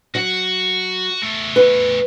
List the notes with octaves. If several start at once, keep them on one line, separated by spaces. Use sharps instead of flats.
F#3 F#4 F#5
E2 A3
B4